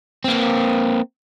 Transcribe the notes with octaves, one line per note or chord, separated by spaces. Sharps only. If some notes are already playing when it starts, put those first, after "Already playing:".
A#3 C4